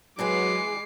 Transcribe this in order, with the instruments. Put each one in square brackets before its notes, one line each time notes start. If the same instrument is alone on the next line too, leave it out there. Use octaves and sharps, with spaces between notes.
[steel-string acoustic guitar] E3 G#4 B4 [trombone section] F#3 [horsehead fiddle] G#3 [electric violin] D6 C7